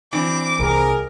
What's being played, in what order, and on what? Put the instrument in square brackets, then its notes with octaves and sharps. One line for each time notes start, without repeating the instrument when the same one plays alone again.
[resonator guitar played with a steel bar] E3 C4 D4 [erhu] D6
[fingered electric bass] C2 [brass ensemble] G#4 A#4